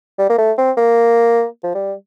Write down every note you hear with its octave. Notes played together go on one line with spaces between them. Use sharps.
G3
A#3
A3
C4
A#3
F3
G3